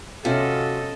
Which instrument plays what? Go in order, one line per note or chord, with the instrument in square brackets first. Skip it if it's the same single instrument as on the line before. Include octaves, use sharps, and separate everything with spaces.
[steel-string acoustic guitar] C3 [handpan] C#4 F4 F5 [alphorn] F#4 [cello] A4 D#5